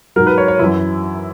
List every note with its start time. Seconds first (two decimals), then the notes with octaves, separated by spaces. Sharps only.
0.16 G#2 F#3 A#4
0.27 B4
0.38 C#5
0.48 C#5
0.59 F#2 E3 E4